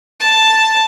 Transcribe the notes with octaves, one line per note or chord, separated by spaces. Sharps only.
A5